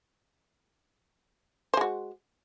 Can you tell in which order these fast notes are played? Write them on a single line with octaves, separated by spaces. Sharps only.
C5 G#3 F#4